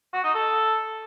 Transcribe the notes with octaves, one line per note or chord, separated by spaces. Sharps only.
F#4
D#4
A4